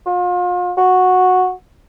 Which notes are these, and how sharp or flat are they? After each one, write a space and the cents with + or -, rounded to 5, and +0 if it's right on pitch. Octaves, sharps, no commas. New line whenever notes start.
F4 +40
F#4 -10